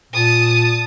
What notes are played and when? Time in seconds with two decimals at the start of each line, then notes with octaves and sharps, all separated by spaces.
0.13 A#2 A5 D#6